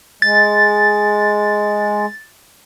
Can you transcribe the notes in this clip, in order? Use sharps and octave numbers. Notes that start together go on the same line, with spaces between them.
G#3 A6